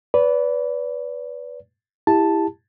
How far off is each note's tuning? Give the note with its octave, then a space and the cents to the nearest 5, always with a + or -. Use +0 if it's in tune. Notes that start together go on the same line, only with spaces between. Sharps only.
B4 +0 D5 -30
E4 +0 G4 +25 A5 +0